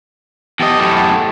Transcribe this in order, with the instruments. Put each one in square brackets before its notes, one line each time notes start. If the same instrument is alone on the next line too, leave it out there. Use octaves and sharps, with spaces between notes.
[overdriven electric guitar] E2 D#5 [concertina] G4 A5
[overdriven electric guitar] F#2 A2